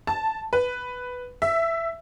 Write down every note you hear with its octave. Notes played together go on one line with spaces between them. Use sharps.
A5
B4
E5